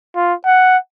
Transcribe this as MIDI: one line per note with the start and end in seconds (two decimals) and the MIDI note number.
0.16 0.34 65
0.46 0.77 78